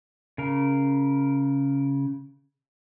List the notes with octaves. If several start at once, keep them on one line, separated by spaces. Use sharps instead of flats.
C#3 A#4